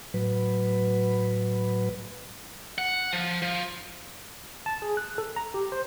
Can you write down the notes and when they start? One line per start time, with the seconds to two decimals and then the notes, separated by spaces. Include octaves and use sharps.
0.14 A2 F#3 B4
2.78 F#5
3.13 F3
3.42 F3
4.66 A5
4.82 G#4
4.97 F#6
5.18 A4
5.36 A#5
5.54 G4
5.72 C5